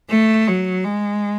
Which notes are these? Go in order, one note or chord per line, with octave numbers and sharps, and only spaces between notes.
A3
F#3
G#3